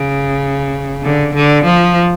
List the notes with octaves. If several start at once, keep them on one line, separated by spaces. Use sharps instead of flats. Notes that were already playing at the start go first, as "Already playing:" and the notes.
Already playing: C#3
D3
D3
F3